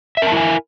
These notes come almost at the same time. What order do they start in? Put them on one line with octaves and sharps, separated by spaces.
E5 A#4 A5 E4 G#5